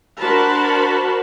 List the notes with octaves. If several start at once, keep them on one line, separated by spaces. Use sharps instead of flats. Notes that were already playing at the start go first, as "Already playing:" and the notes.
D4 F#4 A#4 C5 A5 B5